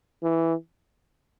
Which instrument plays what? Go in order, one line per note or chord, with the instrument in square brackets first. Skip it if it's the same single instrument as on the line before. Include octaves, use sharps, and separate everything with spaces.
[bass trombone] E3